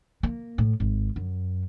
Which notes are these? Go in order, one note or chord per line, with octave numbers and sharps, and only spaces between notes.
A#3
A2
G#1
F#2